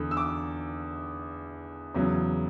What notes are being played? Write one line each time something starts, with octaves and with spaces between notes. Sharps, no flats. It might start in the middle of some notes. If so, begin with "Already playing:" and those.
Already playing: E2 D3
E6
D6
E2 C#3 F#3